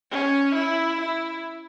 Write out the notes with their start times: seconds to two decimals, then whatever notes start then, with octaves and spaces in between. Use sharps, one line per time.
0.11 C#4
0.55 E4
1.00 E4